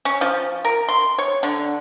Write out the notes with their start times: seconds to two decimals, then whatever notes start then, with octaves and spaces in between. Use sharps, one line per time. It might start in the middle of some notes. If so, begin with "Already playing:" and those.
0.05 C#4
0.21 F3
0.65 A#4
0.89 C6
1.18 C#5
1.43 D3